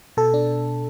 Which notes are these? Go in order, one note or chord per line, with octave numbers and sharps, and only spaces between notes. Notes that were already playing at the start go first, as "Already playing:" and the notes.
B2 A4
D4